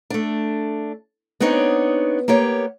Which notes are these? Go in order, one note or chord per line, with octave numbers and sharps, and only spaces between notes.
A3 D4
B3 C4 D4 D#4 C#5
A#3 B3 G4 C#5